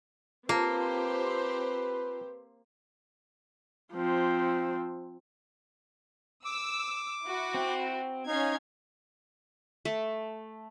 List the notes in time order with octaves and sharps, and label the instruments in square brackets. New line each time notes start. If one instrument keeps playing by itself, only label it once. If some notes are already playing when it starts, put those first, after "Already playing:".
[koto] A#3 [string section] C4 G4 C5 [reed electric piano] F4 A5 [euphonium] B4
[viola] F3 C4
[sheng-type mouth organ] D6 [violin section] E6
[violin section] E4 F#4
[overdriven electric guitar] C4
[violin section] C#4 F5 G#6 [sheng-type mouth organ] D#4
[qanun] A3